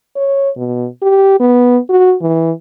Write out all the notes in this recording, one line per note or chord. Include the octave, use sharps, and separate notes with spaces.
C#5
B2
G4
B3
F#4
E3